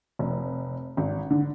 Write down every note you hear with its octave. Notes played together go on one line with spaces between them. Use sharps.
F1
G#1
D3